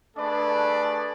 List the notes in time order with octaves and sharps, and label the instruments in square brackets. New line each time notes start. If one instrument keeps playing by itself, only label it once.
[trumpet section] A3 D4 G#4 A4 B4 D5